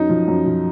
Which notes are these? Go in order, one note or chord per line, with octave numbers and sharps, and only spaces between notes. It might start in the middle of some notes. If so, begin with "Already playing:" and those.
Already playing: F#2 D#4
F3
F#2
F3